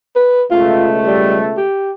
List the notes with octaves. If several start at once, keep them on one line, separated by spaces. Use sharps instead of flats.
B4
C#2 B2 A3 F4
G3
G4